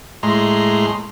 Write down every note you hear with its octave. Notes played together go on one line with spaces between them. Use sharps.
A2 G#3 A#5 C6